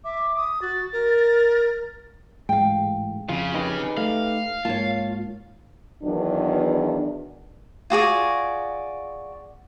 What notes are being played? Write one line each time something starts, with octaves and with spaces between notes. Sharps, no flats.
E5 D6
D#6
F#4 A6
A#4
A1 G#2 G#3 F5 G5
F2 C#3 F4
D#4 G4 B4
A3 F5
G#2 A#3 F4 C#5 A5
E2 D#3 F#3 B3 D4
F4 F#4 G#4 D5